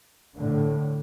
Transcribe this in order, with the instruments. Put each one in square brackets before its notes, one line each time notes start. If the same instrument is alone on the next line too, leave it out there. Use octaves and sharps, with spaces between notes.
[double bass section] A2 D3